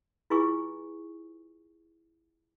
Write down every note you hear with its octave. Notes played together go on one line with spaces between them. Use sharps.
E4 F4 G#4 B4 G#5 C#6